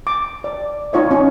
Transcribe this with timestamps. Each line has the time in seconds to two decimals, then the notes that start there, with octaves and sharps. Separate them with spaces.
0.07 D6
0.44 D5
0.93 D#4 F4 C#5 D#5
1.11 C#4